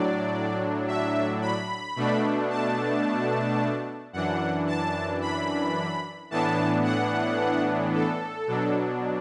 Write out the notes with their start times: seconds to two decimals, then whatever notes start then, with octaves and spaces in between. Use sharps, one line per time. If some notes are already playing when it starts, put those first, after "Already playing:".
Already playing: A2 F#3 D4 D5
0.88 E5
1.42 B5
1.96 B2 A3 D4
2.50 A5
4.13 F#2 E3 D4 F#5
4.67 A5
5.21 B5
6.31 A2 E3 B3 D4 A5
6.84 F#5
7.93 A4
8.47 B2 F#3 D4